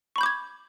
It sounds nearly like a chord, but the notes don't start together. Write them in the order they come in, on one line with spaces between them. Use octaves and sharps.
C#6 B5 G6 D6 G#6